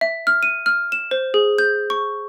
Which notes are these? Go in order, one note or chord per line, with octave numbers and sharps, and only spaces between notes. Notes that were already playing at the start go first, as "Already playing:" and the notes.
E5
F6
D#7
F6
E7
C5
G#4
G6
C#6